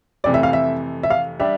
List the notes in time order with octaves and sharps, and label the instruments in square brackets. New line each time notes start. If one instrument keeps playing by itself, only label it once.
[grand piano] F2 C3 E3 A3 [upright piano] D5
[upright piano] E5
F5
E5
E5
F5
[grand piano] G3 D4 G4 [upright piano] E5